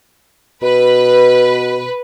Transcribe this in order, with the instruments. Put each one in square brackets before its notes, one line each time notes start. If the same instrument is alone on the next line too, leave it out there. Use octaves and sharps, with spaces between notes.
[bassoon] B2 [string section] B4